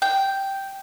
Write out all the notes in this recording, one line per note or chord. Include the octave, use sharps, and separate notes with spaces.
G5